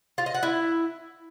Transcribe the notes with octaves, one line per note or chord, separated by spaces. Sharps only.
F4
D#5
F#5
E4